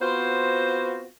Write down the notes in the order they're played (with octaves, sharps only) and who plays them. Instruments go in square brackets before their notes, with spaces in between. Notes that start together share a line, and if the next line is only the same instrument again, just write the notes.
[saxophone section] B3 C4 F4 F#4 C5